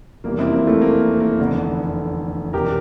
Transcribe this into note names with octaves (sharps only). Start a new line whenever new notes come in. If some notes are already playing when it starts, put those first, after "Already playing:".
F1 E2 C3 G3 A#3
C4 E4
A#3
A3 C4
A#3
A#3
A#3
F1 E2 D3
E1 E2 C3 E3 G4 A#4